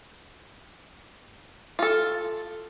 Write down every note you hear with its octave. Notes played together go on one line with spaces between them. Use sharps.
F4 A4